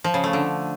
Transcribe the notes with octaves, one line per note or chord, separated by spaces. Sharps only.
F3
C#3
A3
D3